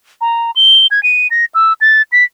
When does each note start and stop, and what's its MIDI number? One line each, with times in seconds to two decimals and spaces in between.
0.21 0.51 82
0.56 0.87 103
0.91 1.02 92
1.03 1.27 99
1.31 1.45 94
1.54 1.73 88
1.81 2.02 93
2.12 2.24 95